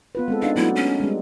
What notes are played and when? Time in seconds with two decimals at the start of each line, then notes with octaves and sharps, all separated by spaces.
0.15 B3 F4 B4
0.28 G#3 C4 A4
0.42 D4 D#4 F5
0.56 F#3 A3 B3 E4
0.76 C#4
1.00 G3 G#3